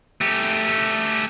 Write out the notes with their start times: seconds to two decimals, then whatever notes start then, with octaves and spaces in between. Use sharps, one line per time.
0.21 A3 G4